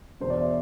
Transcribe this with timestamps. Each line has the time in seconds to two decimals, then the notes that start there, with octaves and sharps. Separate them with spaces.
0.21 E2 B2 C5
0.30 D5
0.40 E5